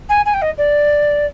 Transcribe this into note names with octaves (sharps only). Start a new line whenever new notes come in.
G#5
G#5
G5
D#5
D5